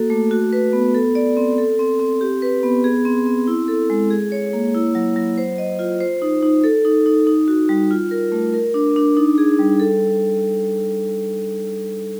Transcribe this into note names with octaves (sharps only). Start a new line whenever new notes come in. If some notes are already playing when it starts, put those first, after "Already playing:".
Already playing: A#3 F#4 A4
A3
F#4
B4
B3
A4
D5
C4
A4
C4
C4
G4
B4
B3
G#4
C4
C4
E4
A4
G#3
G#4
C#5
A#3
E4
F#3
F#3
C5
D#5
F4
C5
D#4
D#4
A4
D#4
D#4
D#4
F#4
G3
F4
A#4
A3
A#4
D4
D4
D#4
G#4
G3
A4